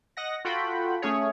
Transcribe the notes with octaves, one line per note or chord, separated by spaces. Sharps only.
D#5 F#5 A#6
F4 F#4 A4 F#5 G5 B5
A3 C#4 G#4 C#5